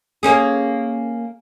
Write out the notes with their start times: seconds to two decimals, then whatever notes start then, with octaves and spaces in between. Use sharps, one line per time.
0.23 A#3 C#4 G#4